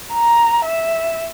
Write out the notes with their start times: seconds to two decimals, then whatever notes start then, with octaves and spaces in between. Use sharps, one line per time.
0.14 A#5
0.65 E5